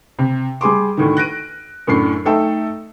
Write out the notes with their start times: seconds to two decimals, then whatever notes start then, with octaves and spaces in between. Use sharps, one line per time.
0.19 C3
0.61 G3 G#4 C6 D6
0.97 D2 A2 D#3
1.17 F#6 A#6 D7 D#7
1.87 F#2 A2 D4 C7
2.25 A3 D#4 A4 E5 G5